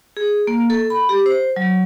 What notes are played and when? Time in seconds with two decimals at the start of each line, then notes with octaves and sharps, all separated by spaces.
0.17 G#4
0.47 A#3
0.70 A4
0.90 B5
1.09 G4
1.26 C5
1.56 F#3